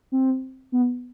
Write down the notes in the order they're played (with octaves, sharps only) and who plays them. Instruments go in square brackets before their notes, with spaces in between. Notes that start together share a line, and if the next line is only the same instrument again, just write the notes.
[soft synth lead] C4
B3